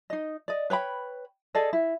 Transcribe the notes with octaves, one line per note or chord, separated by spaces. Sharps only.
D#4 D#5
D5 D#5
B4 C#5 G5 B5
G#4 A4 D5 D#5
E4